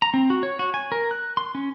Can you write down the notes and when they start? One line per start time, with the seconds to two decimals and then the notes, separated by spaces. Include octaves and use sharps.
0.02 A#5
0.14 C4
0.30 F#4
0.43 C#5
0.59 F#4
0.74 G#5
0.92 A#4
1.11 F#6
1.37 C6
1.55 C#4